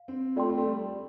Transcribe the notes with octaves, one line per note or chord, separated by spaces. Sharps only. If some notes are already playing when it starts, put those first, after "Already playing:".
Already playing: F5
C4
A3 F4 D5 G5 C6
C4
A3
G3